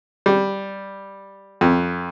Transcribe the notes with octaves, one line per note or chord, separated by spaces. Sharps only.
G3
F2